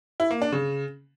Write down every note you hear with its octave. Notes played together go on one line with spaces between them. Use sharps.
E4
A#3
D4
C#3